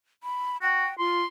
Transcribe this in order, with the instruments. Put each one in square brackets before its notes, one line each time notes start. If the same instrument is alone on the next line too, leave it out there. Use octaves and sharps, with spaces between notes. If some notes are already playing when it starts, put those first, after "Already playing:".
[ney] B5
[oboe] F#4 [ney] G5
[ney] F4 [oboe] C6